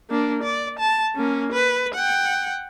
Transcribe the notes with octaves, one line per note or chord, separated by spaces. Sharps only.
A#3 D4
D5
A5
A#3 C#4
B4
F#5 G5